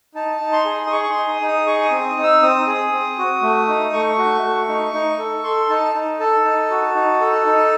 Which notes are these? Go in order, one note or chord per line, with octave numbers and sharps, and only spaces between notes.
D#4 A5
D#4
C6
G#4
D#6
G#4 C#6
C#6
C6
D#4
D#6
D#4
D#6
G#4 C#6
D#6
C4
D#6
D#4
E6
C4 D#6
G#4
C4
F#4
A3
D#4
A3 C#6
F#4
A3
D#4
D#4
A4
A4 C6
D#4 A5
D#4
A4 A5
D#4
F#4
D#4
A4
D#4